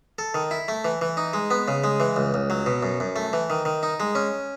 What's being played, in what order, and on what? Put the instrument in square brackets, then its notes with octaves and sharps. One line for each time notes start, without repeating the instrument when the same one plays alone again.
[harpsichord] A4
D#3
E4
A3
E3
E3
D#4
G#3
B3
C#3
G#3
E3
C#2
C#2
F#3
B2
F#2
F#2
A3
E3
D#3
D#3
D#4
G#3
C#4